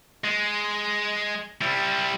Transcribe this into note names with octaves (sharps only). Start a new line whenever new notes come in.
G#3
G3 E4